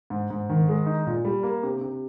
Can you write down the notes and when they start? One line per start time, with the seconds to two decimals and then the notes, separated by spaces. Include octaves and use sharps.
0.10 G#2
0.30 G#2
0.50 D#3
0.68 G#3
0.86 D#4
1.06 A#2
1.25 G3
1.43 A#3
1.63 C3
1.81 C3